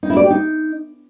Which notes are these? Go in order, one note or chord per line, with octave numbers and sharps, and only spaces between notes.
D#4
E4
D5
G4
D#4